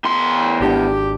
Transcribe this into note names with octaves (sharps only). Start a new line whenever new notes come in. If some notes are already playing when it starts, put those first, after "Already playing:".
E2 C6
G#1 D4 G4